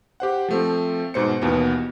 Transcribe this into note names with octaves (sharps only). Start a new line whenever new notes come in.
G4 C5 F#5
F3 A3 C4
G#2 B2 C5 C#7
D#2 B2 E3 B3